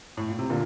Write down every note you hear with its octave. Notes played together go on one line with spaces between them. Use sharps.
A2
A#2
C3
A#2 D3